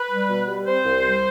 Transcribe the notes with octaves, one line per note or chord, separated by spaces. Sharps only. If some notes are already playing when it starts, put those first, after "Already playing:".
Already playing: B4
G3
B2
G3
C4 C5
C2
G3